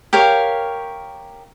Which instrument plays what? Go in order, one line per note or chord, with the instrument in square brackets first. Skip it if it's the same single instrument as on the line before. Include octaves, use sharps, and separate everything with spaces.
[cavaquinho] G4 A#4 C#5 F5